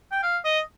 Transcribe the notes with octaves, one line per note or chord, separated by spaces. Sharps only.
G5
F5
D#5